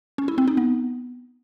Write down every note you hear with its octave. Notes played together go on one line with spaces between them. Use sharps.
C#4
E4
C4
D#4
B3